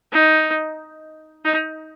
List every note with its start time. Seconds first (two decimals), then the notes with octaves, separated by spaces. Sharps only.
0.12 D#4
1.45 D#4